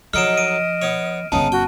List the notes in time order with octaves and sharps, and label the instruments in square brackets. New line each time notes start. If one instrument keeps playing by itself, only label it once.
[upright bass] F3 [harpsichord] F#3 D#4 A4 [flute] D#5 [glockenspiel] F6 D7 E7
[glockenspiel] D7 D#7
[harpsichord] B3 C#5
[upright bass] G1 C#4 [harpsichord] C#3 B3 D#4 [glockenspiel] A5
[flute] F#4 [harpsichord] G5